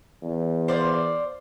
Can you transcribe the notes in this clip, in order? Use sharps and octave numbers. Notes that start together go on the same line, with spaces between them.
E2
C5 D5 F5